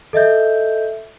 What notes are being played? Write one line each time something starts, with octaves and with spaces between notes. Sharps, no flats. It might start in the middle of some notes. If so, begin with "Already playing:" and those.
A4 D#5 E5 G6